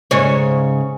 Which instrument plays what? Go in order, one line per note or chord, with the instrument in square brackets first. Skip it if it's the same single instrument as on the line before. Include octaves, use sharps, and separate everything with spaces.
[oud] G#2 C#3 C#5